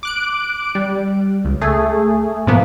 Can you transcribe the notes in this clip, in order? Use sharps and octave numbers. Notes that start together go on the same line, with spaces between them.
D6 F#6 D7
G3
C#2
A3 G#4
G#2 B2 F3 A#3 B3